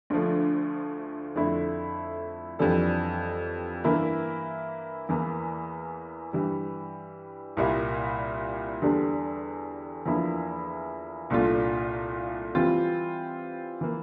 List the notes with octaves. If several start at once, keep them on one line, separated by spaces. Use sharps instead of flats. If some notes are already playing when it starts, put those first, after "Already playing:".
D2 D3 F3 A3
F2 D3 A3 E4
F2 E3 G3 D4 A4
G2 E3 A#3 E4 A#4
E2 E3 A#3
G2 E3 G3
C2 A#2 G3 A#3 E4
E2 D3 G3 D4 A4
E2 D3 F3 A#3 E4
C2 A#2 A3 D4 F4
E3 G3 C4 F4
E3 A#3